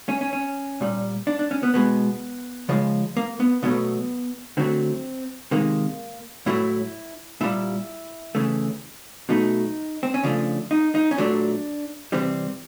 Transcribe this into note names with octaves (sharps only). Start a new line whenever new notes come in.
C#4
C#4
C#4
A#2 G3
D4
D4
C#4
B3
B2 G#3 B3
C#3 F3 G#3
A#3
B3
B2 F#3 A3 B3
D3 F#3 A3 C4
C3 D#3 G#3 A#3
A2 F#3 A3 E4
A#2 G3 E4
C#3 E3 A3
B2 F#3 A3 D#4
C4
C#4
C#3 F3 A3 D4
D#4
D#4
C#4
A#2 F#3 A3 D4
C3 E3 G3 C4